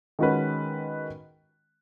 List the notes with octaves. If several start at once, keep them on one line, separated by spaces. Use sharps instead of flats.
D#3 G#3 C#4 F#4 B4